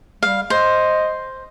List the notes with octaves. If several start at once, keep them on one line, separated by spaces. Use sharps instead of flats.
G3 F5
C5 D#5